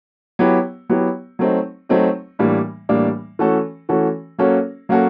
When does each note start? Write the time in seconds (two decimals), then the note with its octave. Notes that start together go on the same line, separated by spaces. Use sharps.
0.39 F#3 B3 E4 G4
0.89 F#3 B3 E4 G4
1.39 F#3 A3 C4 D#4
1.89 F#3 A3 C4 D#4
2.39 A2 E3 G3 A#3 D4
2.89 A2 E3 G3 A#3 D4
3.39 E3 A3 C#4 F#4 A4
3.89 E3 A3 C#4 F#4 A4
4.38 F#3 A#3 C#4 F#4 A4
4.89 F#3 A#3 C#4 F#4 A4